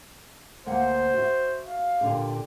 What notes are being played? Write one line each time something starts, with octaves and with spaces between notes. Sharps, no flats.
D2 A#3 C5 F#5
F#4 E5
F5
A#2 D3 G4